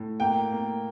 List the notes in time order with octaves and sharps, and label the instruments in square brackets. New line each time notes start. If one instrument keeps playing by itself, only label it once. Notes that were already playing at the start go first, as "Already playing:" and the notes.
Already playing: [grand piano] A2
[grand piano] A#3 [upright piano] G5
[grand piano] A#3